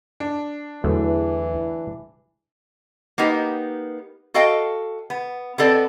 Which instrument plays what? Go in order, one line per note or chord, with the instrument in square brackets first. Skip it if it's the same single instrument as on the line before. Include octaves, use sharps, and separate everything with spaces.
[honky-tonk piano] D4
[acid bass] E2 [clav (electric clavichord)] D3 F#3 A3 [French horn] E3
[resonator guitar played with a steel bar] A#3 B3 D#4 G4
F#4 A4 D#5 F5 G5
B3
B3 C4 A4 D5